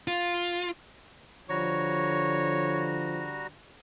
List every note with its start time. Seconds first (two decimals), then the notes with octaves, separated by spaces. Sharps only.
0.08 F4
1.50 D3 F3 G3 F#4 C#5 A#5